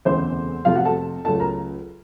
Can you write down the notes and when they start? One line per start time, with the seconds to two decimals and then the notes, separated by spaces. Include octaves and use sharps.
0.05 E1 D2 C#3 E3 C4 C5
0.65 F2 C3 F3 A3 C4 F4 F5
0.75 F#4 F#5
0.85 A4 A5
1.25 C#2 C#3 F#3 A3 C#4 A4 A5
1.40 A#4 A#5